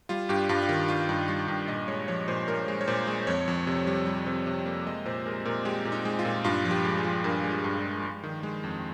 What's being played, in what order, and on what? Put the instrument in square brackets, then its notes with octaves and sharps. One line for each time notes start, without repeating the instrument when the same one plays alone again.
[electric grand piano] G3 F4
G2 G4
G2 F4
F4
D#3 G4
G2 F4
G2 D#4
G3 F4
G2 G4
A#2 D#5
G#3 C#5
F3 C#5
A#2 C5
A#2 A#4
G#3
C#5
A#2 C5
G#3
F2 C#5
F2
C3
G3
G3
C3
C3
A#3
G#3 D#5
A#2 C5
G#3 A#4
A#2 A#4
G#3 G4
A#2
D#4
G#3
F4
A#2
G2 F4
F3
G4
G#3
G#4
F3
G2 A#4
G#3
F4
G2
G4
G#3
G#3
D#3
G#3
F2